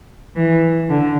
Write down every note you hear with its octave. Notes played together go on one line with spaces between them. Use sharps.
E3
D3